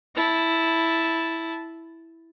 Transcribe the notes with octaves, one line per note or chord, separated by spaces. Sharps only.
E4 A5